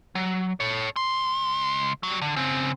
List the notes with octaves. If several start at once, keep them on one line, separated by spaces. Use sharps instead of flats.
F#3
A4 C#5
C#2 C6
F#3 G3
D3
C#3 C4